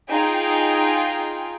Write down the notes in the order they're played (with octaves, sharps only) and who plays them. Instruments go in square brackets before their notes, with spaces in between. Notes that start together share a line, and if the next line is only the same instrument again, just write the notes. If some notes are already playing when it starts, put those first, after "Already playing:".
[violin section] D#4 F4 G#4 G5